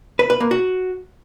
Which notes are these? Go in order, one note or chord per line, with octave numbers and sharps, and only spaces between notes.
B4
B4
A#3
F#4